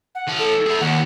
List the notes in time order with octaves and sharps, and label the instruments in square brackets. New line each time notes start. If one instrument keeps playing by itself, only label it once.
[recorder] F#5
[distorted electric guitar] E3 A5
[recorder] A4
[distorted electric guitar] E4 G#4
[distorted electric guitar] D#2 [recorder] F#5